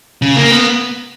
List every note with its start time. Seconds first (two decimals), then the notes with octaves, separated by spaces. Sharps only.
0.22 C#3
0.36 A#3
0.51 B3